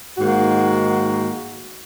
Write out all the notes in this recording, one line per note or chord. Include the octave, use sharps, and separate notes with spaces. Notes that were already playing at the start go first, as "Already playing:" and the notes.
G#2 D#3 A#3 F#4